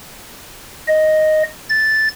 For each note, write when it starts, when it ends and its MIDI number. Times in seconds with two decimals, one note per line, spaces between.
0.88 1.43 75
1.69 2.08 93